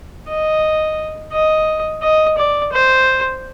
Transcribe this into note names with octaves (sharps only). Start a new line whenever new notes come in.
D#5
D#5
D#5
D5
C5